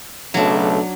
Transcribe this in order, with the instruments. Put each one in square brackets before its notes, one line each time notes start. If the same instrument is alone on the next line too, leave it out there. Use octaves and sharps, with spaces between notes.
[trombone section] B1 C#3 A3 [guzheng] F#3 D4